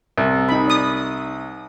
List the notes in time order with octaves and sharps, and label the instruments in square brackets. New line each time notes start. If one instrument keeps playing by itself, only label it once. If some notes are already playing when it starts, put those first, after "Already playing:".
[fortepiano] C2
[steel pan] D#4 B5
D5 D#6